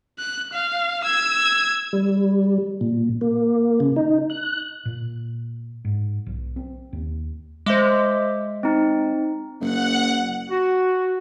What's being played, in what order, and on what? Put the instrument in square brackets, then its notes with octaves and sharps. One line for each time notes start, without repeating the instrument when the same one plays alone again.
[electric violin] F#6
F5
E6 G#6
[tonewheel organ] G3
A#2
A#3
C#3
D#4
F#6
[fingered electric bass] A#2
G#2
B1
C4
D#2
[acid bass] G#3 [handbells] C5 E5 D6
[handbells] C4 D#4
[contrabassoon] F#1 [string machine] F#5
[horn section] F#4